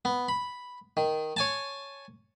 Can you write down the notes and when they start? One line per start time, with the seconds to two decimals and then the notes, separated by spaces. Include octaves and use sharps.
0.05 B3
0.28 B5
0.97 D#3
1.37 C#5 G#5 A5